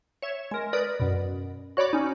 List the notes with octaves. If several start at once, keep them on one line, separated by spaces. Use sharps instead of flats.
C#5 E5
G#3 A#4
A#4 B4 D5 D#6
F#2 B2
F#4 C#5 D5 B5 D6
C#4 D#4